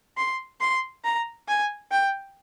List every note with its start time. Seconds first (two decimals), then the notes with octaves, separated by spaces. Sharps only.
0.17 C6
0.61 C6
1.04 A#5
1.48 G#5
1.91 G5